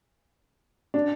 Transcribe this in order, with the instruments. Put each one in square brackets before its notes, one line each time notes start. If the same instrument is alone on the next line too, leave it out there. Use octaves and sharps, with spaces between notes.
[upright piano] D4